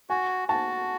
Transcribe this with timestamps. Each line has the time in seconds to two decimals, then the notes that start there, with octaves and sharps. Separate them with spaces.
0.10 F#4 G#5
0.49 F#4 A5